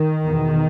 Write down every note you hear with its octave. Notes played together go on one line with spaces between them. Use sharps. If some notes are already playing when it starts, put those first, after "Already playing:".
Already playing: D#3
E2 B2